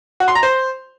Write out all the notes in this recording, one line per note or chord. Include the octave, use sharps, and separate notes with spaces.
F#4
C6
A#5
C5